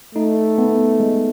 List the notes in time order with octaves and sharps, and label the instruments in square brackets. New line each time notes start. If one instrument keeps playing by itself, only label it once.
[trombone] A3 [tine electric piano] D#4
[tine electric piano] B3
G#3